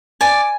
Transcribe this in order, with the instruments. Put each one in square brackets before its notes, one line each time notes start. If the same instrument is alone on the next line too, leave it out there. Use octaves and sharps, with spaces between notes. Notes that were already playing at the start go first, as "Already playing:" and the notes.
[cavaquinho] D5 G#5